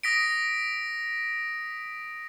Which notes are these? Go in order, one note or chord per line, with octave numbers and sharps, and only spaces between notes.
D#6 A#6 B6 D7